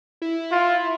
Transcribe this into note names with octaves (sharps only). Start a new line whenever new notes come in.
E4
F4